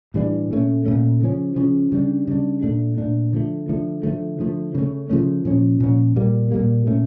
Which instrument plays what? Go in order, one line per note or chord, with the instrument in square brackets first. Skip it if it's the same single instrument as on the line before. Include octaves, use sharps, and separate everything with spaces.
[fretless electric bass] A2 E3 G3 D4
A#2 A3 C#4
A#2 A3 C#4
C#3 F3 C#4
C#3 F3 C#4
C#3 G3 D4
C#3 G3 D4
A#2 A3 D4
A#2 A3 D4
D3 F3 A3
D3 F3 A3
D3 F3 A3
D3 F3 A3
C#3 F3 A3 C#4
C#3 F3 A3 C#4
A#2 F3 C#4
A#2 F3 C#4
A#2 G3 A#3
A#2 G3 A#3
A#2 A3 C#4